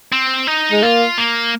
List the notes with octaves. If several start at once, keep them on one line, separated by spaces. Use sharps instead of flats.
C4
D#4
G#3
A#3 F4
A#3